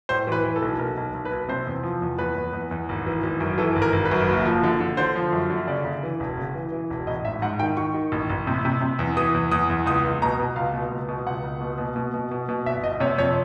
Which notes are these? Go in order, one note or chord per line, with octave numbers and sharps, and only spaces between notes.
A2 C5
E3 B4
E3
A4
B1
B1 A#4
B1
B1
B4
B1
C3 C5
E2
F3
E2
E2 B4
E2
E2
E2
G#1
E3
G#1
F#2
E3 A4
G#1
A#4
G#1
B4
F#2
F#1
F3
D3
D3
D3 C5
F3
F#2
D3
C#3 D5
C#3
E3
E1
C#3
E3
E3
E1
A1 D#5
G#2 E5
G#2 F#5
D#3 G5
D#3 C#6
D#3
A1
A1
C3
C3
C3
E2
E3 D#6
E2
E2 D#6
E2
C#2 D#6
C#2
B2 A#5
B2
C#2 F5
B2
C#2
B2
C#2 F#5
C#2
B2
B2
B2
B2
B2
B2
G1 E5
G1 D#5
C3 C#5
F2 C#5